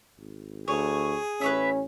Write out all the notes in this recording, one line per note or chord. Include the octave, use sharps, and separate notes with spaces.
G#1
D2 G#4 C#5
A1 C#4 B4 C#5 E5